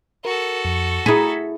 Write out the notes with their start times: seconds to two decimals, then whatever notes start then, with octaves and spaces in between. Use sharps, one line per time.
0.25 F#4 A4 A#4
0.65 F2
1.06 E4 G#4 A#5 G#6 B6